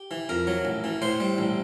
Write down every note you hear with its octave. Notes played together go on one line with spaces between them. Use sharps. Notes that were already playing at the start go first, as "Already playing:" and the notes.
Already playing: G4
E3
F2 A#4
F#3
A1
E3
A2 C5
G3
A1